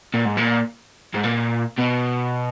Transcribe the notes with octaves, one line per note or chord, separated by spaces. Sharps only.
A#2
G#2
A#2
G#2
A#2
B2